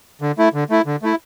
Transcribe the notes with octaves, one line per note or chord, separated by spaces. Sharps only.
D3
A3 E4
D3
A3 E4
D3
A3 E4